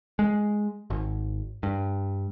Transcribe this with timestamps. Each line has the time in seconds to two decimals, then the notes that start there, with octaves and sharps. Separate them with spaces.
0.19 G#3
0.90 G#1
1.63 G2